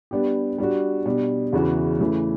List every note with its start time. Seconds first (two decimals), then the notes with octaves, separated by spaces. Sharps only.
0.11 G3 B3 D4 G4
0.58 G3 D4 F#4
1.06 B2 G3 D4
1.53 E2 C#3 E3 B3 F#4
2.00 C#3 E3 A3